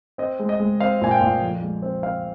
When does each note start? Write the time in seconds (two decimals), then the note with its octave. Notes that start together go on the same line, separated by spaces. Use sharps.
0.18 C4 D#5
0.39 G#3
0.49 D#5
0.60 G#3
0.80 C4 F5
1.01 A#2 G#5
1.11 G5
1.21 A#2
1.42 F2
1.63 G#3
1.82 C4
2.03 C4 F5